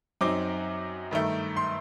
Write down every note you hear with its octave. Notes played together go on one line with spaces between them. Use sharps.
F#2 F#3 C4 D#4 D6
G2 D#3 A3
C6